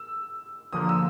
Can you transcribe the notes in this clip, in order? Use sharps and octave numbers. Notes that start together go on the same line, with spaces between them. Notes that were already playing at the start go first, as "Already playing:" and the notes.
Already playing: E6
D3 F3 A#3 D#6
E6